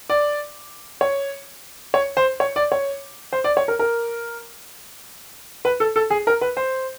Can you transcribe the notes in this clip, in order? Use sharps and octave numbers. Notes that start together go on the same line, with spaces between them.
D5
C#5
C#5
C5
C#5
D5
C#5
C5
D5
C#5
A#4
A#4
B4
A4
A4
G#4
A#4
B4
C5